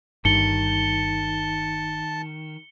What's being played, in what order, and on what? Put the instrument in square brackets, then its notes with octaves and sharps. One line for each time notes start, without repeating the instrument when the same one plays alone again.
[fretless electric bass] G1 G2 [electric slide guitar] D#3 [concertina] A5 [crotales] C#7 G7